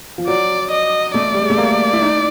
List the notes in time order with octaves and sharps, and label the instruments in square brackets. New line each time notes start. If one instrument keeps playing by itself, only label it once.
[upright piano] F3
[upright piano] F#3 [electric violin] D5
[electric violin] D#5
[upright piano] A3 [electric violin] D5
[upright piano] G3
G#3
A3
A#3
E4
D#4